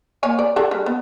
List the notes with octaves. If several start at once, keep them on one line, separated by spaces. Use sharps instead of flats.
A#3 C#5 G#5
D5
D4 G#4 A4
G3
B3